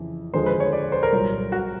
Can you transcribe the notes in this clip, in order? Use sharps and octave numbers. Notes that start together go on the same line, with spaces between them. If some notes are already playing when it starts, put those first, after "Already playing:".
Already playing: F2 C#3 E3
D#2 D3 F3 G#3 C5
B4
C#5
D5
C5
A#4
C2 A#2 F#3
F#4